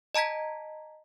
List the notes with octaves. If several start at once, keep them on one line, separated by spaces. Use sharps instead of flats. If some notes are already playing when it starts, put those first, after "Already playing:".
D#5 A5 A#5 G#6 B6